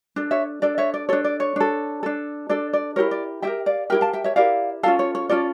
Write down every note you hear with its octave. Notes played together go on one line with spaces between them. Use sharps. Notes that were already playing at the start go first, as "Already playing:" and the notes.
D4 A4
C#5 E5
D4 A4 D5
C#5 E5
D5
D4 A4 C#5
D5
C#5
D4 A4
D4 A4
D4 A4 D5
D5
E4 G4 A#4 C#5
D5
E4 G4 A#4 E5 G5
D5 F5
E4 G4 A#4 E5 G5
F5 A5
E5 G5
C#5 E5
E4 G4 A#4 D5 F5
C#4 F4 A4 F5 A5
C#5
C#5
C#4 F4 A4 D5